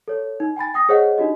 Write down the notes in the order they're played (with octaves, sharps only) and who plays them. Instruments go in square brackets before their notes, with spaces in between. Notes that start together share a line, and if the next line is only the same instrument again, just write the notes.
[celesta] A4 C#5
D#4
G5 G#5 B5 A6
G5 D#6 A#6
G#4 C5 C#5 D#5 F#5
D4 D#4 F#4 G4 D#5